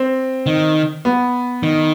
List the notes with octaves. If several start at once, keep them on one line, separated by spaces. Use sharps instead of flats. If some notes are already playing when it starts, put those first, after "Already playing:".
Already playing: C4
D#3
B3
D#3